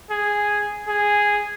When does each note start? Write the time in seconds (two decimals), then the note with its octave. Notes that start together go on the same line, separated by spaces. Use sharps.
0.10 G#4
0.88 G#4